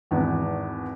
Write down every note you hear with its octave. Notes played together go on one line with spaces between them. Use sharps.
G#1 E2 B3